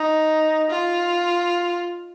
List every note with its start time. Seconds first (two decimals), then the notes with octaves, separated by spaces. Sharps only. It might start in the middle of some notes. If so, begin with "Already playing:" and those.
Already playing: D#4
0.70 F4